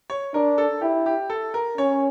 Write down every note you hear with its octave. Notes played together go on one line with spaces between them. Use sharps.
C#5
D4 A#4
A4
E4 G4
G4
A4
A#4
C#4 C#5